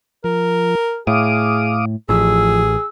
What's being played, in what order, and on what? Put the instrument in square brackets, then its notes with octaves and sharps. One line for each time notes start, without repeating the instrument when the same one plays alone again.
[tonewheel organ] F3 [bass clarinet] A#4
[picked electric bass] A2 [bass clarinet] G#4 [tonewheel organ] F5 D6 D#6
[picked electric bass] A1 [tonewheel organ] F3 [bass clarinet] G#4 [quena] E6